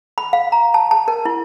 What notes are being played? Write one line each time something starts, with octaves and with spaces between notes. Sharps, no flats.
B5
F5
A#5
A5
A5
A#4
E4